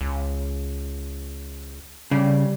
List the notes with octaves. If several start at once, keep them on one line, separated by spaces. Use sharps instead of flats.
C#2
C#3 G3